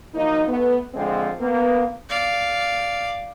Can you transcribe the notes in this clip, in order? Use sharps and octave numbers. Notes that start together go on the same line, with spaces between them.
F3 F#3 A#3 D#4
A3 B3
D3 F3 G#3 C4
A#3 B3
D5 F5